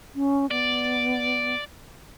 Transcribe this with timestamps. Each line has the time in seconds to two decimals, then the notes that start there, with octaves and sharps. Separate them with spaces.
0.15 C#4
0.51 B3 D5